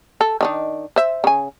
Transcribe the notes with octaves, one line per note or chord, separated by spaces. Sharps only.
A4
D#3 D4 D#4
C5 E5
C#3 G#5